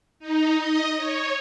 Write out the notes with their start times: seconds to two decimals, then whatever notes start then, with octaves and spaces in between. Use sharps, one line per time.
0.19 D#4
0.58 D#5
0.97 C#5